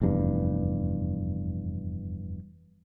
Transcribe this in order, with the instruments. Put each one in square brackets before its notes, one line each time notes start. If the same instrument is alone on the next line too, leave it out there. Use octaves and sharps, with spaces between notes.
[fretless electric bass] F1 E2 G2